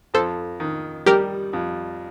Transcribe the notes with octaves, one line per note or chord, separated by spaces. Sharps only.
F2 A4 C5
D#3
G3 G4 A#4
F2